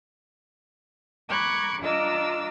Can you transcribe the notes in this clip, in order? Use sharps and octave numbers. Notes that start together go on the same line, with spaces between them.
A#5 B5 C#6 D6 F#6 G#6
D4 F4 D#5 A#5 D6 E6